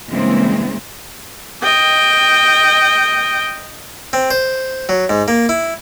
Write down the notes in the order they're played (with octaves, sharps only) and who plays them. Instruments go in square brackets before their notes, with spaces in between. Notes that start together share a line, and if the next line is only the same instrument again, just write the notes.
[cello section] G2 C#3 E3 G#3 A#3 C4
[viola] D#5 G5
[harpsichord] C4
C5
F#3
G#2
A#3
E4